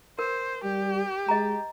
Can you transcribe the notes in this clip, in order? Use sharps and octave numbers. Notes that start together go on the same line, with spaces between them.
A#4 C5
G3 G4
G#3 D#5 A#5